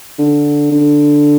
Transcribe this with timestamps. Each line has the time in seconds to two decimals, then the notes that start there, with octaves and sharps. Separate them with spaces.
0.19 D3
0.72 D3